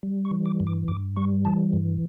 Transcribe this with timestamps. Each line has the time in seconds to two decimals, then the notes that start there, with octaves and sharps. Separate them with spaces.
0.03 G3
0.25 C#6
0.31 E3
0.46 D6
0.60 G2
0.67 D6
0.88 G2 D6
1.16 G3 C#6
1.45 E3 A5
1.73 G2